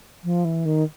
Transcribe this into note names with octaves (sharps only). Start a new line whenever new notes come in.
F3
E3
D#3